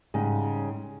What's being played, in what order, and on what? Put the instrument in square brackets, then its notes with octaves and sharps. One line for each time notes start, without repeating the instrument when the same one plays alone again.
[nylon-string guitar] G#2 C#3 G3